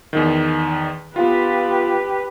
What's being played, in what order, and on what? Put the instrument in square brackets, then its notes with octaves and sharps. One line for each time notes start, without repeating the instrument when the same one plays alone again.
[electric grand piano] E2 D#3
[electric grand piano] B3 F4 [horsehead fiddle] G4 B4